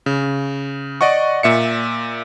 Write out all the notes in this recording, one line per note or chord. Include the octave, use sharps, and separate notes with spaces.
C#3
D5 D#5 F#5 C#6
A#2 E5 C#7